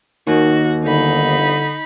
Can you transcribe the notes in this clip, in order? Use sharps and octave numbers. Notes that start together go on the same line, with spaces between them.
D#2 D#3 F#4
G1 D3 D#4 B5